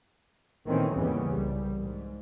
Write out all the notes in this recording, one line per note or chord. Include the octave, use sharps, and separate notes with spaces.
A#2 D#3 E3 A3 C4 C#4
D#2 G#2 C#3 E3 G3 B3
C2 G3
G#2